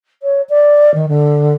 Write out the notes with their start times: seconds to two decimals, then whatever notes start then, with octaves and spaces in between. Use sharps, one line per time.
0.22 C#5
0.49 D5
0.94 D#3
1.08 D3